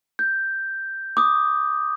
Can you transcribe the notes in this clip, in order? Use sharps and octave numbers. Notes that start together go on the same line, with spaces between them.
G6
D6 D#6